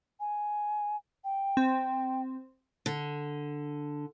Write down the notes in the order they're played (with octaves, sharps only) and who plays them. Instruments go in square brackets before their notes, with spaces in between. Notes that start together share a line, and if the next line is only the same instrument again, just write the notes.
[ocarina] G#5
G5
[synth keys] C4
[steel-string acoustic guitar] D3